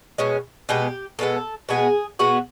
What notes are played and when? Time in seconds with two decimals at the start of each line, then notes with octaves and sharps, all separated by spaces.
0.18 B2 G#3 C#4
0.69 B2 G#3 B3 G4
1.19 B2 G#3 B3 A4
1.69 B2 G#3 B3 G#4
2.19 B2 G#3 B3 F#4